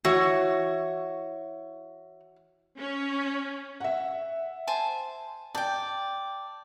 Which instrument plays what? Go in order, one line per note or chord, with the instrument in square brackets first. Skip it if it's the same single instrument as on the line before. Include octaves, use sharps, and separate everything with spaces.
[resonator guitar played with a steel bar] E3 C#5 [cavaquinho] F#4
[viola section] C#4
[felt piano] E5 F#5
[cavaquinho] C5 G#5 A5
[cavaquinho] D5 G5 [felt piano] A5 G6